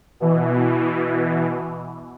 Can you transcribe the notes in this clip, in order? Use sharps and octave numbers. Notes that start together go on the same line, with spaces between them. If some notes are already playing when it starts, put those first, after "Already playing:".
B2 E3